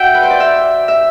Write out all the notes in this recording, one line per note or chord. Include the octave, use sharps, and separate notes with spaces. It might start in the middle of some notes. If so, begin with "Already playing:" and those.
Already playing: F#4 D5 E5 F#5 G5
B4
C5
D5
E5
E5